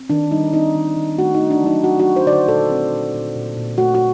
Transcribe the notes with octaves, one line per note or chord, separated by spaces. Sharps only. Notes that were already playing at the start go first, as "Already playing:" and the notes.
Already playing: C4
D#3 D4
G3 D#4
C4 D#4
D#3
D#3
A3 F#4
D#4
A3
D4
F#3 D#4
F#3 F#4
F#4
A3
C5
D3 D5
C5
A#2 A4
C4
A#2
A#2
A#2
A#2
A3 F#4
F#4